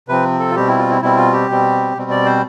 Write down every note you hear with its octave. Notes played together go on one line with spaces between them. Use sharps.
C3 F3 C4 B4
A4
F4
B2 G3 C4 G4
E4
F4
E4
B2 G3 C4 E4
F4
G4
B2 G3 C4
B2 G3 C4
D5
C5